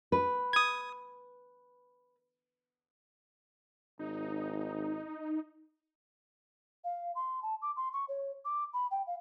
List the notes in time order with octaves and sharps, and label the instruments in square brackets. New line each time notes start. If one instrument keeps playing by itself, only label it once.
[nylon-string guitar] B4
[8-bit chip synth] D#6 G#6
[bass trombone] G#1 [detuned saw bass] D#4
[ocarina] F5
C6
A5
D6
C6
C#6
C#5
D6
B5
G5
F5